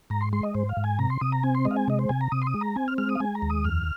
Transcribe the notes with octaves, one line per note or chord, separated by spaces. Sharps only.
G#2 A#5
C6
G#3 C6
D#5
G#2 C5
F5
G#2
G#5
C3 A#5
C6
C3 D#6
A#5
C4 G#5
C6
G#3 D#5
F5
G#5
C3 D#5
C5
C3 G#5
A#5
C3 D#6
C6
D#6
G#3
A#5
C4 G#5
F6
G#3 F6
D#6
F5
G#3 G#5
A#5
D#2
D#6
F2 F6